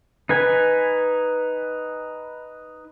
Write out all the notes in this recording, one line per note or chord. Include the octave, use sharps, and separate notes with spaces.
D#4 B4 G#5